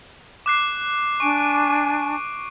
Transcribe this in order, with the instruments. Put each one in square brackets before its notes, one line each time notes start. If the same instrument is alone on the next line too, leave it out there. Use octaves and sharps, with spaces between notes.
[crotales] D6 F#6 C7
[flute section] D4 G#5 [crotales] C#6 D7